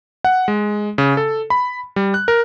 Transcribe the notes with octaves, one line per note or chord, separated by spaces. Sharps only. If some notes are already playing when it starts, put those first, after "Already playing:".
F#5
G#3
C#3
A4
B5
G3
F#6
A#4